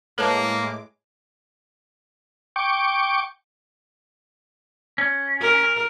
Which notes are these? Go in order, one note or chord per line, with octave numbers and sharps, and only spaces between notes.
A2 G#3 A#3 A4 B4 C#5 A5 D6
G5 C#6 D6
C#4
A#4